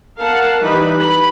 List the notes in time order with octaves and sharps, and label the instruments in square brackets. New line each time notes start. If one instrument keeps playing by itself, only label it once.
[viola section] A#4 F5 F#5 A5
E3 G3 D#4 B4 B5
B5